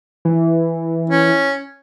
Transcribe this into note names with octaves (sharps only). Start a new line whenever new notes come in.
E3
C#4